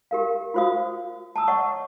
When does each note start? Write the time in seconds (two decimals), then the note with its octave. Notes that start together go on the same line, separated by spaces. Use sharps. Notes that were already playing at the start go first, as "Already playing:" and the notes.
0.11 G4 A#4 F5
0.54 F4 F#4 C5 F5 D#6
1.36 A5 A#5 D#6 E6
1.48 C#5 D#5 F#5 C#6